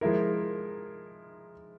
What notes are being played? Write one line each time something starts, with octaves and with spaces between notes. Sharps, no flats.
F3 G#3 E4 A#4